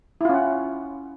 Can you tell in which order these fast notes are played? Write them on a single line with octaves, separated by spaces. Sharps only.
E4 F4 C#4 F#5